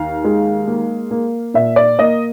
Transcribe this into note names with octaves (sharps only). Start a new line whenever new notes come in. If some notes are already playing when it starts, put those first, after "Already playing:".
Already playing: D#2 F5
G#3
A#3
A#3
A#2 E5
D5
A#3 D#5